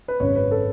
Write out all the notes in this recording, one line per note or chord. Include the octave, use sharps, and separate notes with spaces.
B4
G#1 F#2 C#3 C#5
B4
A4